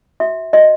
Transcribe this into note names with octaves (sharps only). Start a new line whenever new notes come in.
F#4 E5
F#4 D#5